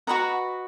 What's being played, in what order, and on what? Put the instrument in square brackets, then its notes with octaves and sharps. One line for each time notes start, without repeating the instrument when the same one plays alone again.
[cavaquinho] F#4 B4 D#5 F#5 A#5